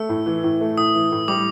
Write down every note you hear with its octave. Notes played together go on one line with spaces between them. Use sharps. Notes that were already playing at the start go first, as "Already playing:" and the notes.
Already playing: A3 E6
A2
E3
A2
A3
A2 D#6
E3
A2
G3 D6